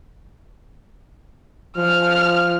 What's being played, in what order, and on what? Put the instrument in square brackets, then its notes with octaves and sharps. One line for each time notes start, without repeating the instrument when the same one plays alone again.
[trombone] F3 [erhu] F6